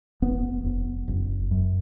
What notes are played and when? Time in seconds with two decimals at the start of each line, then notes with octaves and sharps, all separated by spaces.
0.22 F1 B3
0.64 F1
1.08 F#1
1.51 F#2